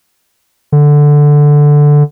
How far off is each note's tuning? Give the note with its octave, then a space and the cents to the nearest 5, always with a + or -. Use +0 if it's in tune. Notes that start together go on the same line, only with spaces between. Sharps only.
D3 +0